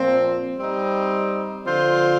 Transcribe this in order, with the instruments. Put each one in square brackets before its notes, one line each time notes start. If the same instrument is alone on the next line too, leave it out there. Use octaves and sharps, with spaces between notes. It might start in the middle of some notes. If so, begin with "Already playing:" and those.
Already playing: [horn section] A#2 F3 C4
G3 C4 D#4
D3 F3 C4 F4 C5